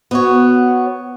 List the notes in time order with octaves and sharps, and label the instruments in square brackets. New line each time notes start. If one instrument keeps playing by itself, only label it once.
[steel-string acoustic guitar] B3 F#4 C#5